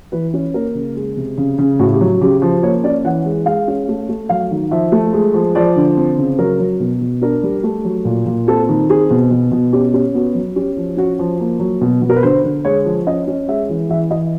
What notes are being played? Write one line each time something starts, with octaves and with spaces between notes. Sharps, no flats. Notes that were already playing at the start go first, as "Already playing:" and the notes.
E3 B4
C#4
A#3 A#4
C#3
G#3
C3
C#3
C#3
A2 F#4
G4
F#3
C#3 G4
F3
A#3 C#5
C#4 D5
E3 F#5
G#3
G#3 F5
C#4
A3
A3
F#3 F5
D#3
F3 E5
A3
G#3
F3
F3 D5
D3
C4
C#3
F#3 A#4
F#3
B2
B2
D4 A#4
G3
A3
F#3
A#2
A#2
C4 A4
D#3
C4 G#4
B2
B2
B2
C#4 G4
C#4 G4
B3 F#4
F#3
C#4 G4
F3
C#4 F#4
F3
A#3
F#3
B2
B2
A#4
B4
D3 C5
D3
G#3 C#5
F3
C#4 D#5
C#4
G#3 E5
E3
E3 E5
E3 D#5